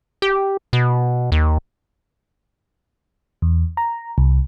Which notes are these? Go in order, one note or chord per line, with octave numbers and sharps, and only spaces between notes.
G4
B2
D#2
E2
A#5
C2